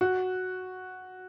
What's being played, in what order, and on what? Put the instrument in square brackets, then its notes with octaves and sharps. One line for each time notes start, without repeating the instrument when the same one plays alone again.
[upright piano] F#4